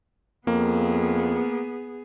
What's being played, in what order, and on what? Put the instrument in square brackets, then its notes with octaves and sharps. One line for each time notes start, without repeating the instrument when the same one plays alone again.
[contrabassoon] F2 [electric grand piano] A#3 [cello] B3 G#4